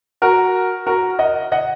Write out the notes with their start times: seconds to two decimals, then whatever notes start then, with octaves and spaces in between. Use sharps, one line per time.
0.22 F#4 A#4
0.87 F#4 A#4
1.19 D#5 F#5
1.52 D#5 F#5